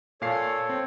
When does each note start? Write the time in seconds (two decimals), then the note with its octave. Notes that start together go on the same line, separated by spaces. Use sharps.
0.21 A#2 A4 C#5 F5 C7
0.69 C4